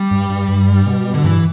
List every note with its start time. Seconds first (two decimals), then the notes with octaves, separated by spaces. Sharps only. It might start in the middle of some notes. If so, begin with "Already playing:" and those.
Already playing: G3
0.11 G2
0.30 G2
0.49 G2
0.86 B2
1.14 D3
1.24 G2 E3